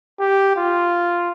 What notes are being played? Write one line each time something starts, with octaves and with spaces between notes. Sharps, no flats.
G4
F4